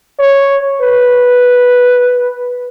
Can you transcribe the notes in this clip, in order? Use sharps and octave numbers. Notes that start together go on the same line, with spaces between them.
C#5
B4